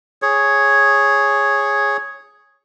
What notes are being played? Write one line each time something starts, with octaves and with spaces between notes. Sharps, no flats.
G#4 C#5